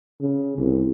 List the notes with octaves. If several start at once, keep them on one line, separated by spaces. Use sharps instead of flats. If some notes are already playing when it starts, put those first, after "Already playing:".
C#3
C2